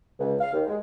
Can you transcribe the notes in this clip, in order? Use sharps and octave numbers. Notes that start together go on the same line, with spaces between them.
C#2
F5
D#2
G#3